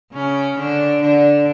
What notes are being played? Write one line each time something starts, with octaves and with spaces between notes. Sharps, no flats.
C#3 C#4
D3 D4
D3 D4